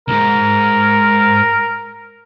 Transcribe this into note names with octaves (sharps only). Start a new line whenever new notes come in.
C2 G#2 A#4